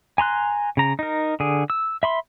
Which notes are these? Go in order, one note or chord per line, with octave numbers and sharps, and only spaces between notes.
G#5 A#5 C6 F#6
C#3 A#5
D#4 A#4
D3 G#4
E6
E5 B5 C6